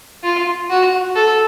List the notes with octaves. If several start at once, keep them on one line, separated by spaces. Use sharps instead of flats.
F4
F#4
A4